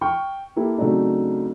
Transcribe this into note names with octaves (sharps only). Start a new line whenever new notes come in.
G5 C#6 F6
A#3 E4 G4 A4
C#3 F#3 A3 C4 D4 D#4